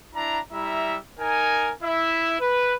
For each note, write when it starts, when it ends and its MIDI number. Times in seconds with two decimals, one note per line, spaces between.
0.15 0.39 62
0.15 0.39 64
0.15 0.39 82
0.52 0.97 55
0.52 0.97 64
0.52 0.97 76
0.52 0.97 82
1.20 1.72 63
1.20 1.72 70
1.20 1.72 80
1.83 2.39 64
1.83 2.39 76
2.40 2.74 71